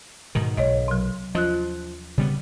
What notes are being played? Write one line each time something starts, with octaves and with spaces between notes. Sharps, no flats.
G#2 B2 D#3
B1 C#5 D#5
C3 F#3
D#2 F3 F4 F#6
C#3 G3 B3